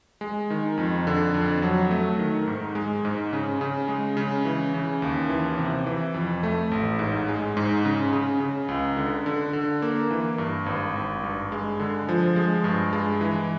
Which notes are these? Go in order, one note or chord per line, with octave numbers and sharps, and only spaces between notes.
G#3
D#3
F2
D3
F2
F#3
A3
D#3
G#2
G#3
G#2
C#3
C#3
G#3
C#3
E3
C#3
D#2
E3
C3
E3
F2
A3
A1
G#2
G#3
G#2
C#3
C#3
C#3
C#2
D3
D3
D3
A#3
E3
G2
G#1
G#1
G2
G#3
D3
F3
G#3
G2
G#3
E3